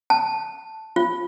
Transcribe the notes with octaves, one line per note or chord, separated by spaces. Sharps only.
A5
F4